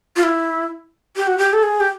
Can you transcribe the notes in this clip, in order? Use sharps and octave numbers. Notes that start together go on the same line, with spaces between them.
F4
E4
G4
F#4
G4
A4
G#4
G4